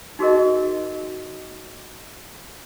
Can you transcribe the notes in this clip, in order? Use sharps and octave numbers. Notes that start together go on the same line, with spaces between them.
D#4 F#4 G#4 A#4 D#5